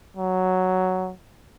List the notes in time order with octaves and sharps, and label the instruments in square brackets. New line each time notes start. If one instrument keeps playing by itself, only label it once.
[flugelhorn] F#3